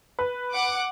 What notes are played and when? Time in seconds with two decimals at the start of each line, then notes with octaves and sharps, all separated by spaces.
0.19 B4
0.53 F#5 D6